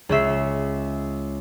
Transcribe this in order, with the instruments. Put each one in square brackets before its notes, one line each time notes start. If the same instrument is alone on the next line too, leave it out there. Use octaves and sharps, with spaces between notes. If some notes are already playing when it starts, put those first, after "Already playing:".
[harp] C#2 C#4 E5 C7